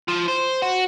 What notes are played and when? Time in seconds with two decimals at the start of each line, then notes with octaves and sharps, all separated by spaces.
0.08 F3
0.28 C5
0.62 F#4